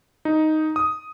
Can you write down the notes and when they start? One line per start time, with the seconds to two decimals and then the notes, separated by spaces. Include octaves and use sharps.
0.25 D#4
0.76 D#6